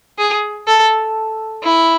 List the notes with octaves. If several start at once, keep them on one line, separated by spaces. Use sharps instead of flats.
G#4
A4
E4